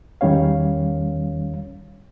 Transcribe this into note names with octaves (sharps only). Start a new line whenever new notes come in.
E2 D#3 G3 C#4 C#5 F5